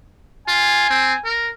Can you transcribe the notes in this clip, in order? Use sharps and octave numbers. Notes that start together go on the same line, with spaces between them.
F4 G#5
C4
A#4